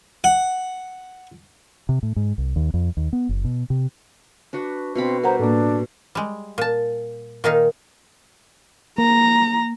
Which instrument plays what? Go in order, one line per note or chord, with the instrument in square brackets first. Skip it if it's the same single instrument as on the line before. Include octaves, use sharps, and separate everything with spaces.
[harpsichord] F#5
[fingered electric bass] C3
A2
G#2
C2
D#2
F2
D#2
B3
F#1
B2
C3
[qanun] D4 F#4 B4
[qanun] B2 F5 B5 [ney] C4
[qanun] G3 [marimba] A#4 F#5 A#5 [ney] C5
[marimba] A2 A#3 [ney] D4
[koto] G3 G#3
A#2 A5
A#2 D#3 D#4 F5
[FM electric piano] A#3 [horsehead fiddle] A#5